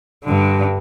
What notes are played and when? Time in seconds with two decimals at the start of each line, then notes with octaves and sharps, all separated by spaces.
0.24 G2 D3